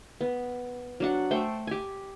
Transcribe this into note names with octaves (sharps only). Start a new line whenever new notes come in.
B3
F#3 D4 F#5
A3 C5 G5 C#6
G4 G#5